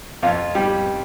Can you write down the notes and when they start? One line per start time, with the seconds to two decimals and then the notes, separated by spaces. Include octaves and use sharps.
0.23 F2 F4
0.55 G3